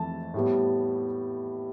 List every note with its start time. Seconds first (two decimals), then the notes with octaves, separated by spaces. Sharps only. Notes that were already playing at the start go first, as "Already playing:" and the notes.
Already playing: F2 E3 A3 A5
0.34 A2 G3 B3